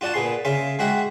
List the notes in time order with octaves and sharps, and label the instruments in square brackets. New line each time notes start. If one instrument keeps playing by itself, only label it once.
[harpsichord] F4 F#4 D5 F#5 A5
A#2 B3 G#4 C6
C#3 E5 F5 G#5 C6
G#3 F#4 E5 F#5 G5